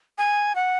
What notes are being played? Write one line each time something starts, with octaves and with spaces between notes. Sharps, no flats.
G#5
F#5